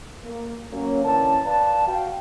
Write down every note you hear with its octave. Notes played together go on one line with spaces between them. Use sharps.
A#3
F#3 A#3 C#4
D3 E3 C#4 A#4 A5
B4 D5 F5 A5
F#4 F5 G5